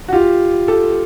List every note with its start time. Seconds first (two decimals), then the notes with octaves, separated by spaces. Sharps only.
0.08 F#4
0.13 F4 G4
0.68 G4 A4